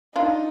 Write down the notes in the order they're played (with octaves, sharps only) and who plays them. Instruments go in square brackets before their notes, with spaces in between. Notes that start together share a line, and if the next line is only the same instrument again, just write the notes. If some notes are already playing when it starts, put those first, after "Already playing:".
[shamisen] D4 F4 [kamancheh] D#4